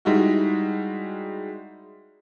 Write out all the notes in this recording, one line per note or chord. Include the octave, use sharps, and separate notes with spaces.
G3 G#3 D#4 E4 F#4